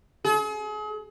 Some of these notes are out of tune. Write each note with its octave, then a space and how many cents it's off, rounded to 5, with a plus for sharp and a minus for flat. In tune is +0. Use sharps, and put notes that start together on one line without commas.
G#4 +40